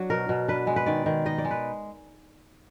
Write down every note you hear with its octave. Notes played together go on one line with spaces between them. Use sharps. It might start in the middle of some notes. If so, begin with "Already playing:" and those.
Already playing: F#3 D4 F#4
B2 A#4
B2
D4 B4
G#3
B4
D#3 D5
D#3
D#4 D#5
D5
G#3
B4